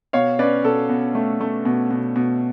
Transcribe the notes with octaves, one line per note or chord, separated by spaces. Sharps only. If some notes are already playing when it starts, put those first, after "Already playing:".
B2 C#5 F5
C#4 B4 D5
B2 A4
B2
A3
A3
B2
B2
B2